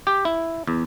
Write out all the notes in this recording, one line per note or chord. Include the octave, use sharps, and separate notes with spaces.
G4
E4
E2